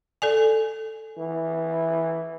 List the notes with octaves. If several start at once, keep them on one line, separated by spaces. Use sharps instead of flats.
A4 D5 G#5
E3